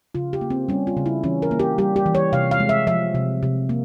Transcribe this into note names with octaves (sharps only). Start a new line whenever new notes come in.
C#3 F4
G4
A#3
C4
G3 C#4
F4
C#3
E4
E3 C#4
A#4
A#3
G4
G3 G4
G4
E3
C#5
C3 F5
F5
G#3
E5
F3 E5
C3
C3
A#3